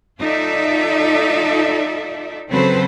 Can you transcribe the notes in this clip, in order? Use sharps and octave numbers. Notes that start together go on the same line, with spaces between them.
D#4 F4 A4 D5 E5
C#3 F#3 C4 A4 B4 C5